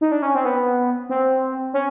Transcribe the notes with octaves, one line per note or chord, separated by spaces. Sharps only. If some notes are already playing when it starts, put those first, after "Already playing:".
D#4
D4
C#4
C4
B3
C4
C#4